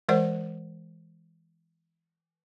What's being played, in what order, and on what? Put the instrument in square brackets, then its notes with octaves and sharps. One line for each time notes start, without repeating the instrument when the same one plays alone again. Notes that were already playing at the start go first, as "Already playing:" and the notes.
[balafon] E3 G#3 A#4 C5 D5 F#5